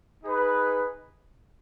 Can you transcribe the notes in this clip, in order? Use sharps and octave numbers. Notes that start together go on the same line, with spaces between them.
D#4 G#4 B4